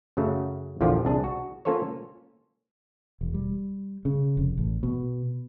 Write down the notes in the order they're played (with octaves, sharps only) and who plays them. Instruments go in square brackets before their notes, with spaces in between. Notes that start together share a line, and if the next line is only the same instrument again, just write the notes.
[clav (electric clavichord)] F#2 C#3 F#3 A3
A#1 E2 D3 F3 F4 G4
C2 D4 G#4
F#4
A#3 C#4 F4 A4 C5 C#5
[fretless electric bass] E1
G3
C#3
F1
A1
B2